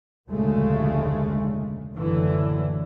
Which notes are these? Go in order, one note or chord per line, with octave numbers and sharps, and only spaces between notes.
F1 D2 A#2 C#3 G#3 A3
F#1 A2 D3 E3